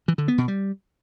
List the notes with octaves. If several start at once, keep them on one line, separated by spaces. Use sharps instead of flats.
E3
D3
B3
B2
G3